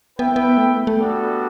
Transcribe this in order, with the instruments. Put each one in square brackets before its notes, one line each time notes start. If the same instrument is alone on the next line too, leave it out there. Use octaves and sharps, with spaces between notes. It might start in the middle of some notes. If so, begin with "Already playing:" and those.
[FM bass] B3 [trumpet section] E4 B4 E5 G5
[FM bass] B3
A3
B3
A3
A3
[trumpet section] G3 B3 D4 F#4 A4